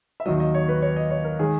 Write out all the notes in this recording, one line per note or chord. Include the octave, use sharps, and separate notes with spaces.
E5
D#2 D#3 F#3 D#5
D#5
C#5
B4
C#5
D#5
C#5
A#4
D#3 G#3 G#4